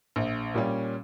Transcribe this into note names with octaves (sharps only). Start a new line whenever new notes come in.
A#1
A#2 G3 C#4